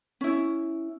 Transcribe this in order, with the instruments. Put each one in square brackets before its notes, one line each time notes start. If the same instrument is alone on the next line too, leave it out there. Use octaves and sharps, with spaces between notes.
[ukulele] C#4 E4